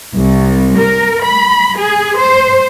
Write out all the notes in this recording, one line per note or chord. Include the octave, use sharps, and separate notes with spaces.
C2
A#4
B5
G#4
C5